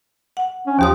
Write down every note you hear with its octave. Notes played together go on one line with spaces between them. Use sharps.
F#5
C#4
D#2 F3 G4 D#6